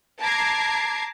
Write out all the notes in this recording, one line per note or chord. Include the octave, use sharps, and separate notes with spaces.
A5 A#5 D6 G#6 C7